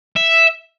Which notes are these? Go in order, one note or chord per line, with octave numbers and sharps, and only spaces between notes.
E5